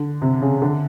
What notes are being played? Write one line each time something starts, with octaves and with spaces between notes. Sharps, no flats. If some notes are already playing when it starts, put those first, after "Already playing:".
Already playing: D3
C3
C#3
D3